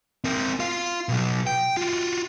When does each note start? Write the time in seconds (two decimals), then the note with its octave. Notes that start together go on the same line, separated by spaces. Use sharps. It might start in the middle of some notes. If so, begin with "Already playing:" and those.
0.24 C4 A#4
0.60 F4 F5
1.09 B2 F#3
1.47 G5
1.77 F4 F#4